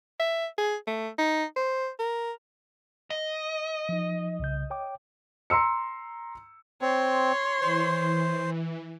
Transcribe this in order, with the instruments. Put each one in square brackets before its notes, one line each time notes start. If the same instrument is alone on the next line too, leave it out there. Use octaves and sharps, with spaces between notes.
[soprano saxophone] E5
G#4
A3
D#4
C5
A#4
[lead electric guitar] D#5
[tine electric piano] F3 D#4
C2 C#3 G6
C#5 G5 D6
[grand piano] A#5 C6 E6 C#7
[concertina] C4 [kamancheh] C#5 C6
[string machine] E3 [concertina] C5